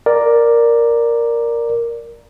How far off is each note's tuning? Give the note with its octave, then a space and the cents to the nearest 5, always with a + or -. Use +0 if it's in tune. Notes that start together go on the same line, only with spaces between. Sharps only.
A#4 +0 D5 +0